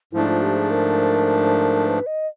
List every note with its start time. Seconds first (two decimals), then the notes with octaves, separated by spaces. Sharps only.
0.12 G#2 F3 A3 D4 E4
0.28 F4
0.43 G4
0.57 G#4
0.71 A#4
1.87 B4
2.07 D#5